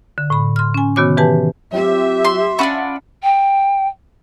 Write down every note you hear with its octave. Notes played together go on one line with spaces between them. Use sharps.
D3
A2 B5
C6 F6
C#4 G#5
C3 D#3 B3 F#4 C#5 D6
E3 G4 B4 G#5 A5
F#3 C4 F4 G4 E5
C6
C#4 D4 F4 F#4 F#5 B5
G5